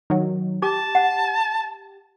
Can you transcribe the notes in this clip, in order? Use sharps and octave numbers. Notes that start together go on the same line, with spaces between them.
D#3 F#3
G4 A5 D6
F#5